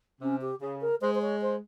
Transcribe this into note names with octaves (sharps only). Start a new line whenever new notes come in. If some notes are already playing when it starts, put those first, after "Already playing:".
C3 C#4
G4
C#3 G#4
A#4
G#3 C5
C5
C#5
C5